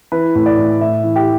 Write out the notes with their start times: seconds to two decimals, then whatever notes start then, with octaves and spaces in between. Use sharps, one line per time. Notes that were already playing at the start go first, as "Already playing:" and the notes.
0.12 E3 B4
0.35 A2
0.46 D5
0.58 A2
0.81 A2 E5
1.04 E3
1.16 G4